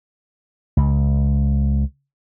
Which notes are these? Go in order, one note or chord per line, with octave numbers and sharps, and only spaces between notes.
C#2